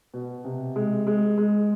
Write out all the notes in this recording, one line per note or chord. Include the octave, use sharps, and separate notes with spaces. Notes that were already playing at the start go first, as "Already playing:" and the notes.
B2
C3
G#3
G#3
G#3